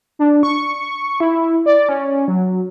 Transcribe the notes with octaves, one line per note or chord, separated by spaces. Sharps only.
D4
C#6
E4
D5
C#4
F#3